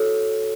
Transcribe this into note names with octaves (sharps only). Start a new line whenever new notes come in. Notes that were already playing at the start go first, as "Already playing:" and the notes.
Already playing: F#4 A4 C#5